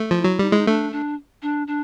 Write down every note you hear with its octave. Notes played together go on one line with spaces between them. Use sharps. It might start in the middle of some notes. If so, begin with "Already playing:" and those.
Already playing: A3
F3
E4
F#3
G3 D#4
G#3 E4
D#4
A3 D4
D4
D4
D4